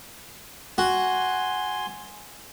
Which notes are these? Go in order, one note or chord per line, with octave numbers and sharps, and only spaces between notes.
F#4 G#5 C6